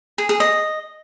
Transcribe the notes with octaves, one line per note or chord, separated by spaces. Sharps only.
G#4
G#4
D#5